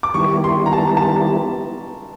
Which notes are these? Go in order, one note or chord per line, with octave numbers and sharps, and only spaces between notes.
D6
D#3 G3 B3 E4 G4 C#6
C6
A#5
A5
A5